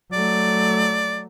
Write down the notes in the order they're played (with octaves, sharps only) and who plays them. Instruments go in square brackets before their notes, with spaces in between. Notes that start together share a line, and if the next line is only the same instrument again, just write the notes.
[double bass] F#3 A3 [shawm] D5